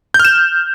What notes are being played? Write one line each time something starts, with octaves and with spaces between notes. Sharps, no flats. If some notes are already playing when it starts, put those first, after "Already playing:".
G6
F6
E7